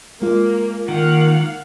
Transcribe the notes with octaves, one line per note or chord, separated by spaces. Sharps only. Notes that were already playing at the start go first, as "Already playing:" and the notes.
G#3 A#3 F4
D#3 A#3 F5 F#5